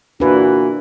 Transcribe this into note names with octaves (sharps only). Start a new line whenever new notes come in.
A#2 E3 A#3 D4 F#4 B4